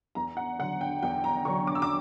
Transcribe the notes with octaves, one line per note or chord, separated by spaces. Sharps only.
E2 A#5
F#5
D3 F#3 F#5
G5
E2 G5
A#5
D3 F#3 C#6
D6
E6
D6